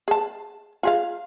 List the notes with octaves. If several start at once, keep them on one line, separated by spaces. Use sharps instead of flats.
G#4 A5
F4 G#4 F5